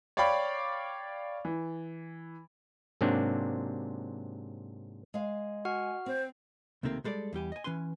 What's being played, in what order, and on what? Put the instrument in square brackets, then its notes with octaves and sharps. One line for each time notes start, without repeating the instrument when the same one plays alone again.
[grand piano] C#5 D5 F5 G5 B5 D6
E3
[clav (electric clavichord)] G#2 C3 F#3 A#3 C4 D4
[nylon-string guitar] G#3 F5
[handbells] F#4 F#5 F6 [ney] G#5
[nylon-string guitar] C4 [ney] C5
[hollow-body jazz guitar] C#2 C3 D#3 A3 A#3 C4
G3 G#3 A4 C5 D5
E2 G3 G4 G#5
D#5 G#5
E3 C#4 B4 G#5 C6